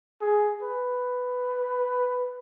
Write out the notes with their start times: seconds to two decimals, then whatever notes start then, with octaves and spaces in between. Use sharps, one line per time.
0.21 G#4
0.62 B4